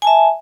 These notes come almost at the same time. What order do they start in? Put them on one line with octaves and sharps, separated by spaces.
G#5 A5 E5